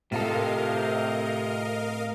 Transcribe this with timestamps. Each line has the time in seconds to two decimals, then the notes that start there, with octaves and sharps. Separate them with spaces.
0.12 A2 C3 F4 A4 A#4 D#5 F5